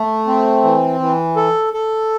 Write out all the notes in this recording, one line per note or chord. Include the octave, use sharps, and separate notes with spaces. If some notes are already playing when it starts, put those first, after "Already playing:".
Already playing: A3
C4
E3
E3
A4
A4